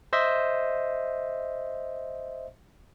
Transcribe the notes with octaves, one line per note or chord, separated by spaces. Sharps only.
C5 D#5 E5